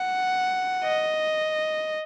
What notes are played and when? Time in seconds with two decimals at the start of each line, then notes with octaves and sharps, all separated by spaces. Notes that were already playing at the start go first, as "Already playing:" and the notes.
Already playing: F#5
0.85 D#5